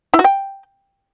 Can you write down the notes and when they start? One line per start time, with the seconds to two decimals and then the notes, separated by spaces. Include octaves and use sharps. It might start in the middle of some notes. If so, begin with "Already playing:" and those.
0.14 E4
0.19 F#4
0.24 G5